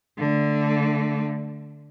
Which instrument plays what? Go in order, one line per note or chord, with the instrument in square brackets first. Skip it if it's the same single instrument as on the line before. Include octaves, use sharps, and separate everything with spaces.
[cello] D3 A3